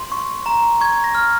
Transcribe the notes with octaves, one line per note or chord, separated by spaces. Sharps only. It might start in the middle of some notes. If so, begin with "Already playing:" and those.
Already playing: C6
C#6
A#5
C#6 G#6
A#6
F6